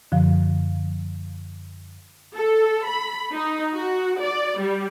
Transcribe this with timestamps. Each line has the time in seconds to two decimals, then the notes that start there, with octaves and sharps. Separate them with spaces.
0.12 F#2 D3 F3 F5
2.35 A4
2.86 B5
3.33 D#4
3.74 F#4
4.21 D5
4.59 G3